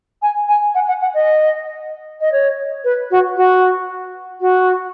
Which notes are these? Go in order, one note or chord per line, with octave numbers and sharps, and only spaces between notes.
G#5
G#5
F#5
F#5
F#5
D#5
D#5
C#5
B4
F#4
F#4
F#4